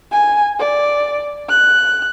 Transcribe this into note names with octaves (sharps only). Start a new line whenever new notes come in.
G#5
D5
F#6